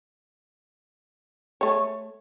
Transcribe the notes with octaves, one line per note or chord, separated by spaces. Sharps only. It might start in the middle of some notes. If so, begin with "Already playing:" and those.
A3 C#5